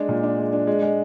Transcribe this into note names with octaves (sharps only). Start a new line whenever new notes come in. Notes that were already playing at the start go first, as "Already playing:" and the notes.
Already playing: G#3 D4
A#2
D4
G#3
D4
G#3
G#3